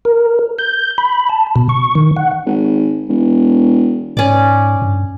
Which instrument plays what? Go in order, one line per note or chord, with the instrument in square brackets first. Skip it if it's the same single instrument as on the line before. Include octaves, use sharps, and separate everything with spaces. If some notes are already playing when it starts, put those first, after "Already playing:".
[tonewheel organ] A#4
G6
B5
A5
B2
C#6
D#3
F#5
[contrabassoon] G#1
E1
[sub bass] G#2 [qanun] C#4 D5
[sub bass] G2